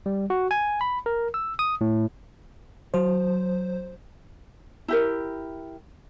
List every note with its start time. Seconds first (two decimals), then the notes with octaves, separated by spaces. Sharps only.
0.06 G3
0.30 F#4
0.51 G#5
0.81 B5
1.06 A#4
1.34 E6
1.59 D#6
1.81 A2
2.94 F#3 C5
4.88 E4 G4 A#4